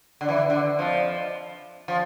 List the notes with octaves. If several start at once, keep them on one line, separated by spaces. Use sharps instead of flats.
D3
E3
D3
D3
F2 F3
F3